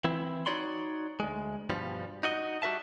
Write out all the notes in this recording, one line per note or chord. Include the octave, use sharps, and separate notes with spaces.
E3 C4 E4
D#4 F#4 C#5 D5 B5 C6
D2 G#3
G2 B2 F3 G3
D#4 F#4 D#5
G3 F#4 A#4 E5 A5